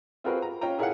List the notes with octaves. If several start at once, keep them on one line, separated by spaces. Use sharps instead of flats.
C4 F4 F#4 G#4 A#4 B4
A#5
C#4 F4 G5 A#5
E4 G#4 A#4 C#5 F5 F#5